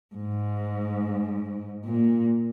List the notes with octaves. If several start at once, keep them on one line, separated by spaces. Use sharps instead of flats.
G#2
A#2